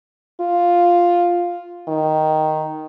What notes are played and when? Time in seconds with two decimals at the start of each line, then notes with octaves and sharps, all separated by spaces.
0.40 F4
1.88 D#3